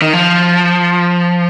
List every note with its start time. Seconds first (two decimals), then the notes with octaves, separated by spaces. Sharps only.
0.02 D#3
0.13 F3